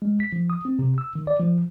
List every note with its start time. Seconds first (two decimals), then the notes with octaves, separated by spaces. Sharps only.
0.02 G#3
0.20 B6
0.33 F3
0.50 D#6
0.65 C4
0.79 C3
0.98 E6
1.15 D#3
1.27 D5
1.40 F3